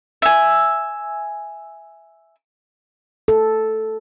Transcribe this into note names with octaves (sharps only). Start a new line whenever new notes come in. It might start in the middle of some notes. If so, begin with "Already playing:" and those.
E5 G#5
A4